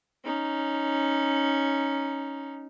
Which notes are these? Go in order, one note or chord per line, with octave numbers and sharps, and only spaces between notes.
C#4 D#4